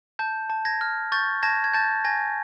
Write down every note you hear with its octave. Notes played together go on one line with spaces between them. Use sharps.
A5 G6
A5
G#6 A#6
F6
C#6 G6 A6
A5 G#6 A#6
G#6
A5 G6 A6
G#5 G#6 A#6